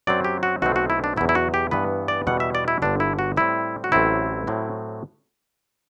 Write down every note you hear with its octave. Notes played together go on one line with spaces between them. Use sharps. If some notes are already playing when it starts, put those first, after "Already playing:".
F#2 F#3 C4 D5
G4
F#4
B1 B2 A3 C4 F#4
F#4
E4
D4
E2 B2 F#3 E4
E4
F#4
G4
G2 E3 B3 B4
D5
E2 B2 G3 F#5
E5
D5
E4
G1 G2 D3 D4
E4
F#4
A2 G3 C4 E4
F#4
A1 A2 F#3 C4 E4
A2 F#3 C4